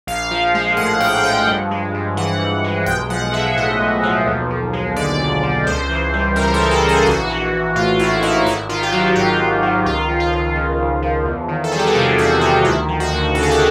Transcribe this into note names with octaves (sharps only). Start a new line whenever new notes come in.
A#1 F5
F3
G#3
A2 F#5
A#1 G5
F3 F#5
G2
G#3
G2
E3 F#5
G2
G#3
B1 G5
F3 F#5
G#3 E5
A2 D#5
B1
F3
D#2
F3
G#3
D3 D5
D#2
F3
C#2 C5
E3
G3
C#3 A#4
A4
C#2
G#4
E3
C5
A#1 F#4
E3
A#1
A2 F4
A#1 E4
E3 D#4
G#1 E4
D#3 F4
G4
F#3 F#4
G#2 F4
G#1
D#3
C#2 F4
F3
F4
C#2
C#3
C#2
F3
E2
D#3
A4
G3 G#4
G4
F#4
C3 F4
E2 F#4
D#3 F4
D2 E4
F3
F#4
D2
C#3 A4
G#4
G4